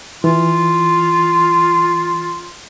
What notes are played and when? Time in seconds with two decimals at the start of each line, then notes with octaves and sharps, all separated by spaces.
0.24 E3 F4